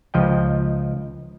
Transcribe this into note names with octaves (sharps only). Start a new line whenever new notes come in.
C#2 F3 D#5 G5